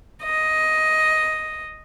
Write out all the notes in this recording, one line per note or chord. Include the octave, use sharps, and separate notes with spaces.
D#5